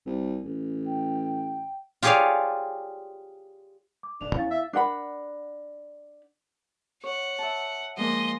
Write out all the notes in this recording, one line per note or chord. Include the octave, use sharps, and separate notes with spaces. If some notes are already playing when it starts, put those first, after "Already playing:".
C2
A1
G5
F4 G4 G#4 C#5 D5 F5
D6
D1 A#1 G#2 D4 F7
E2 A#3 B3 C#4 E4 F5 A6
E5
D4 A#4 F#5 B5
C#5 F#5
E5 A5
F3 G#3 A#3 D#5 C6